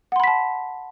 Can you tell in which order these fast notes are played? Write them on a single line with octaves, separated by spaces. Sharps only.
F#5 C6 B5 B6 A5